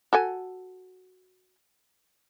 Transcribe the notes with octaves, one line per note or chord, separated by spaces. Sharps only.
F#4 A4 G#5